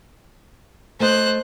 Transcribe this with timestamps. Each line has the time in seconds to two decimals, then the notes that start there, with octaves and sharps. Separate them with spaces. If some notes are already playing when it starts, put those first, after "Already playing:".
1.00 A3 C5 D#5 F#6